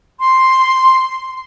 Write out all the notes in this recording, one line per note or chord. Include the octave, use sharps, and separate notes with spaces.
C6